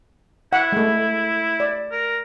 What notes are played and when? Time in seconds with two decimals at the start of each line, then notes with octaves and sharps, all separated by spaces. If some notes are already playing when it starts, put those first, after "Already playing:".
0.53 E4 F#5
0.72 G#3 A3
1.60 D5
1.92 A#4